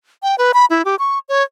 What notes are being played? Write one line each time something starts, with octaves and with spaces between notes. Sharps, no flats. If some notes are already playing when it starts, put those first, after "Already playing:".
G5
B4
B5
E4
G4
C#6
C#5